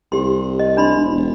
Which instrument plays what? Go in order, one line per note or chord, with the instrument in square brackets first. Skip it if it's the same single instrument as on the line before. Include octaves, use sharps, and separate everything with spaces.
[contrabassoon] C2 [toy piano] G4 C6
[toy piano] D#5
D4 B5 C6
[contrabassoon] E1
E1